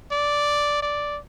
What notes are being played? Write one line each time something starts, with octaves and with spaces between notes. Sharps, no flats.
D5
D5